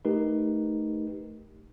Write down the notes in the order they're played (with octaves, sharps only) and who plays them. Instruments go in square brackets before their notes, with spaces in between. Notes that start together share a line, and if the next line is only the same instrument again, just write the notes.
[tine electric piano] A3 D#4 G4 A#4 B4